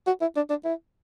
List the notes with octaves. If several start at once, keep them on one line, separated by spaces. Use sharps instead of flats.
F#4
E4
D4
D4
E4